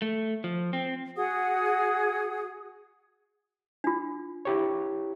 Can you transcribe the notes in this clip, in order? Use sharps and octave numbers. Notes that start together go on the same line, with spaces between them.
A3
F3
C4
F#4 G#4 F#5 D#6
D4 F4
E4 G4 C#5